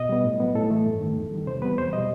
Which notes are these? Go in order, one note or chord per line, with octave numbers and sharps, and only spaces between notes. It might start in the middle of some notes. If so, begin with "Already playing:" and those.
Already playing: B2 D#5
G3 B3
A2
F#3 B3
A2 A4
E3 A3
G2
D#3 A3
E2
D#3 G3
C3 C5
E3 G3 B3 B4
E2 C5
B2 G3 D#5